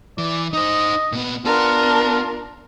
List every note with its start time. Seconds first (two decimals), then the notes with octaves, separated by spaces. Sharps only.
0.18 E3 D5
0.53 D#4 C5 D#5
1.12 A#2 B3
1.45 B3 D4 F4 A#4